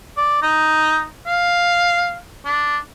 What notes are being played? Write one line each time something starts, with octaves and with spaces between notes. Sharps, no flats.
D5
D#4
F5
D4